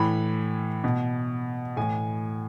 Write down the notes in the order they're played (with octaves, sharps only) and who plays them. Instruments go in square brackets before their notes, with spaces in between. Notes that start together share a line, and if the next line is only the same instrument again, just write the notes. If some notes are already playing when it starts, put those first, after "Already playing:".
Already playing: [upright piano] A2 E3 B5
B2
A2 E3 G#5